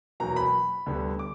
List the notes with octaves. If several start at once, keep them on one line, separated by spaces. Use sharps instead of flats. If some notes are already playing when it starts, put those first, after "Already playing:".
E2 B2 F#3 A#3 A#5
B5
D2 D3 G3 B3
D6